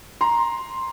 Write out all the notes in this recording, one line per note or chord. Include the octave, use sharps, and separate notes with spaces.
A#5 C6